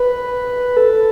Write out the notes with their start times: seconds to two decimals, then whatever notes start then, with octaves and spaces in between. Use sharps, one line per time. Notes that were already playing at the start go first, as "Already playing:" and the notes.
Already playing: B4
0.77 A4